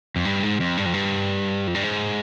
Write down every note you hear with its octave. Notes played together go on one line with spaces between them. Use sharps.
F2
G2
G#2
F2
G2
F2
G2
F2
G2
G#2